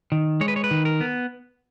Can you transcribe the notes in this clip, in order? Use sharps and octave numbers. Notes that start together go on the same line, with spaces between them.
D#3
G#3 C#5
B4
C#5
B4
D#3
A#4
B3